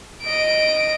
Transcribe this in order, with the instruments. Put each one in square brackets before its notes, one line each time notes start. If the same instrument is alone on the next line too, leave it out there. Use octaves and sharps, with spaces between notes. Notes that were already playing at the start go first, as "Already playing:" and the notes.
[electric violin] D#5 D7